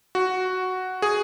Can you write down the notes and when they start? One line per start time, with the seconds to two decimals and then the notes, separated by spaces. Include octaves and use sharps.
0.15 F#4
1.02 G#4